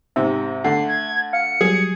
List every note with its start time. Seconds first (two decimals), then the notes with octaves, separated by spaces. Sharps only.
0.16 G#2 C3 E5
0.64 D3 A3 C7
0.88 G#6
1.33 F5 C#7
1.61 F#3 G3 G#4